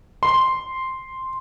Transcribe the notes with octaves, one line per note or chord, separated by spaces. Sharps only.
C6